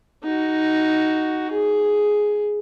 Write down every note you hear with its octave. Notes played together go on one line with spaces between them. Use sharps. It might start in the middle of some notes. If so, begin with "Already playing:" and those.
D#4 F#4
G#4